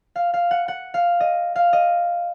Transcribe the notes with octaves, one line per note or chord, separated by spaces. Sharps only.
F5
F5
F#5
F#5
F5
D#5
F5
D#5